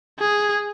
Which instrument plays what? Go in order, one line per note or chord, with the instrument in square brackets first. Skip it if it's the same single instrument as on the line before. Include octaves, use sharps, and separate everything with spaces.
[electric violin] G#4